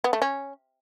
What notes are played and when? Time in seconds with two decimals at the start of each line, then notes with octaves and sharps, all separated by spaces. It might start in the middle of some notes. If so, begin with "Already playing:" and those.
0.04 B3
0.13 A3
0.22 C#4